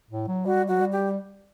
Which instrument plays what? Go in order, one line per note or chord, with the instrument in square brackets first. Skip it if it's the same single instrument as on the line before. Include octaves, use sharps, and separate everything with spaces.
[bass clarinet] A2
F#3
[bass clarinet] G3 [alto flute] F#4
[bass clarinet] F#3 [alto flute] F#4
[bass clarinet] G3
[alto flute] G4